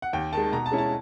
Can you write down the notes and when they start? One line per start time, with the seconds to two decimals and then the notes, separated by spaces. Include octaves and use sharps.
0.02 F#5
0.13 D#2 G5
0.33 D#3 G#3 A5
0.52 B2 A#5
0.66 A5
0.72 G#3 C#4 E4
0.78 A5